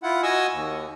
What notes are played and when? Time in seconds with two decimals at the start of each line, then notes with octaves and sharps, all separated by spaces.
0.03 E4 F4 F#5
0.23 F#4 D#5 G#5 C#6 D#6 E6
0.51 D#2